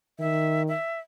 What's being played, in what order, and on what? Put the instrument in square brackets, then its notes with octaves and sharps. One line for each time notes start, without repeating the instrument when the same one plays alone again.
[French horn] D#3 [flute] E5
[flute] E5